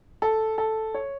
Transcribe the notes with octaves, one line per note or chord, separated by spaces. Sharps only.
A4
A4
C#5